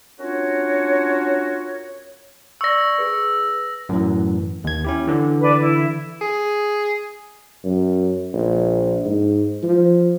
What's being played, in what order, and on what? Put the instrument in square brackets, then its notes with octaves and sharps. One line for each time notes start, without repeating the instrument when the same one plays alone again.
[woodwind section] C#4 D4 F4 F#4 A#4 C#5
[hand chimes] D5 C#6 [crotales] E6 A#6
[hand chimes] G#4 B4
[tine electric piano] F#2 A2 E3
D#2 G#6
C#4 E4 G4
D3 E3
[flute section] D4 B4
E4
[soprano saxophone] G#4
[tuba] F#2
A#1
G#2
F3